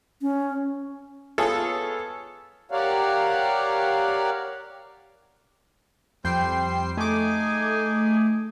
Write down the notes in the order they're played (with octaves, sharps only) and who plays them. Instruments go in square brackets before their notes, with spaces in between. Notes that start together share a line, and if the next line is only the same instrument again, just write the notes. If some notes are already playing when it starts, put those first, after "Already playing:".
[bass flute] C#4
[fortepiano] B3 F4 G#4 A4 C#5
[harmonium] G4 A#4 C#5 D5 F5 F#5
[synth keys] F2 G5 C7 [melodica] G3 C5
[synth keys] A3 D6 [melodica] D#4 G#4 G#5